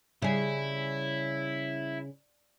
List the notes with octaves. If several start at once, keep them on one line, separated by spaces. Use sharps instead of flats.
C#3 G3 E4 G#4